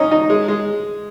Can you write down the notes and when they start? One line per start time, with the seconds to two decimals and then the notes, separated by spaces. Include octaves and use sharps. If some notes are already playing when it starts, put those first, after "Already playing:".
Already playing: C#4 D#4
0.11 D#4
0.30 G#3
0.48 G#3